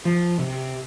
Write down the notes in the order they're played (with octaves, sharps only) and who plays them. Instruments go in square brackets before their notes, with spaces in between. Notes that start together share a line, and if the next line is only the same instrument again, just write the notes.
[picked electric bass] F3
C3